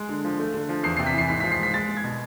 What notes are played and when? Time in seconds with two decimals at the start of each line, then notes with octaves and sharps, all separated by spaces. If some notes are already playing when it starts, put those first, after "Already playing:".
Already playing: G#3
0.09 D3
0.25 F3
0.40 A3
0.54 D3
0.69 F3
0.83 E2 C7
0.97 C3 C7
1.07 B6
1.14 E3 C7
1.29 G#2 B6
1.40 F3 B6
1.52 C7
1.60 G#3 B6
1.74 G#3 A6
1.89 G#3
1.97 G#6
2.04 B2